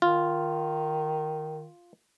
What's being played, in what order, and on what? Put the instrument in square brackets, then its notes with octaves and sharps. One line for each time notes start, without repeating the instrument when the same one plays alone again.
[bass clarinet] D#3 [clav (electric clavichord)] F4